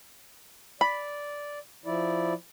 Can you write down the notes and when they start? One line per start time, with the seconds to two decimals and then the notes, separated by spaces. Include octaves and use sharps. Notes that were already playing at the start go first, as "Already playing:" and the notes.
0.81 D5 B5
1.86 F3 E4 D5